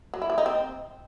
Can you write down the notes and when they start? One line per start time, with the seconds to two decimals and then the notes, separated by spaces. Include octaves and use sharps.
0.14 F#3
0.22 E4
0.30 E3
0.38 D#4
0.46 C4